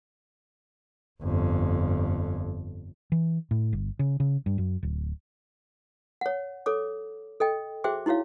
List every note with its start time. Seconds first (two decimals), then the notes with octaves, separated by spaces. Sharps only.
1.22 G1 F2
3.12 E3
3.51 A2
3.73 G1
3.99 C#3
4.20 C#3
4.46 G2
4.58 F#2
4.83 D1
6.21 C#5 F#5
6.66 A4 C#5 D6
7.40 A4 D#5 G5
7.84 F#4 G#4 C5 E5 G5 D6
8.06 D#4 E4 F#4 C#5 F5